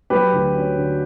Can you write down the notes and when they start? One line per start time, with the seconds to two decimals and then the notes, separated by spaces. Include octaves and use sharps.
0.10 F#3 G4 B4
0.33 D2
0.55 C#4
0.76 D3